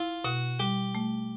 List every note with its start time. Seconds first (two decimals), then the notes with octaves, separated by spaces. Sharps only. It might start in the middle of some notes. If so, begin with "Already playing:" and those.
Already playing: E4 F4
0.24 B2 F#4
0.59 G3 G4
0.95 A3